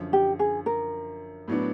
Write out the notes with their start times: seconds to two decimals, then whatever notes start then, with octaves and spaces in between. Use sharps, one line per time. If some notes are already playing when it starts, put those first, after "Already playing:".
Already playing: F#2 D3 F3
0.13 G4
0.39 G#4
0.66 A#4
1.48 A2 F#3 B3 D4